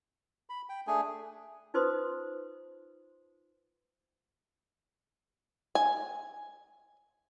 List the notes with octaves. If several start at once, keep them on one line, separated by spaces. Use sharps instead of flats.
B5
G5
A3 D4 G#4 G#5
D#4 F4 B4 C5 C6 D#6
G#5